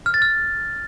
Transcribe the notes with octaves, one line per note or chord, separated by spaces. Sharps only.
F6
A6
F6